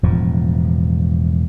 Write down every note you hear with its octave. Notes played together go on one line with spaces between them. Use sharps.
E1 A2 F3